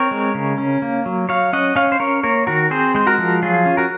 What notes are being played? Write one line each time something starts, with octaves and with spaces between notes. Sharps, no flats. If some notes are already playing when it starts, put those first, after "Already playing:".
Already playing: C4 A#4 C#5
G#3
C#3
C#4
A#3
F#3
F#3 C#5 F5
C#4 D#5 F#5
C#4 C#5 F5
C5
C#4 A#4 C#5
A#3 A#4 C#5
D#3 F#4 A#4
C4 G#4 C5
G#3 C5
F#4 A#4
F3
F#3 F4 G#4
C#4
F#4 A#4